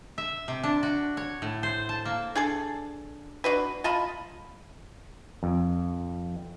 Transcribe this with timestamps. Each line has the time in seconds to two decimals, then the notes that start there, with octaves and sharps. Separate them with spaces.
0.18 E5
0.48 C3
0.63 D4
0.83 F#4
1.17 C#5
1.42 A2
1.63 C5
1.89 A5
2.05 A#3
2.35 D4 G#4 A4
3.44 D4 F#4 B4
3.84 F4 D#5 A5 B5
5.43 F2